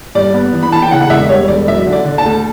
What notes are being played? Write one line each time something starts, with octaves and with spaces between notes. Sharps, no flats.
G2 D5
B3
E3
B5
E3 A5
G5
C#3 F#5
F#5
E1 E5
G3 C#5
E1 D5
F#3 E5
D3
D5
D3
A5
D2